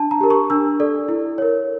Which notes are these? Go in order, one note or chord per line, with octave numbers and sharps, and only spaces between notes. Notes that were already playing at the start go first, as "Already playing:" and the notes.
Already playing: D4 A5
A#5
G4 A#4
C#6
D4 E6
A4 D5
E4
A#4 C#5